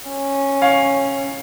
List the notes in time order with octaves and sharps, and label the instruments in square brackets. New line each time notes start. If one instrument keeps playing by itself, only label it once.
[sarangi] C#4
[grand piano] C#5 F5